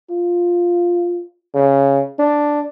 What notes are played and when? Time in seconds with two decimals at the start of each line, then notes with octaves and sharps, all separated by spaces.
0.10 F4
1.54 C#3
2.19 D4